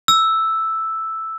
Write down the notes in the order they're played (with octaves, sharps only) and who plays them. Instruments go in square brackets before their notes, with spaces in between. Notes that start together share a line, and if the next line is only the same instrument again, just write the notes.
[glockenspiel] E6